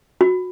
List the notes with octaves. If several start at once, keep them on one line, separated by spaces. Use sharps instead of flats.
F#4